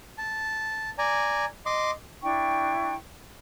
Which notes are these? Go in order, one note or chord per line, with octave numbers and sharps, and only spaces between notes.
A5
D5 G#5 A#5
D#5 C6 D6
D4 E4 G5 C#6